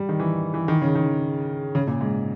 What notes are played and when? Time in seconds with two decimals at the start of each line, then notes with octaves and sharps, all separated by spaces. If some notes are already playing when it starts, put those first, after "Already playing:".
Already playing: G3
0.09 D#3
0.20 E3
0.54 E3
0.68 D#3
0.82 C#3
0.95 D#3
1.75 C#3
1.87 A#2
2.01 G#2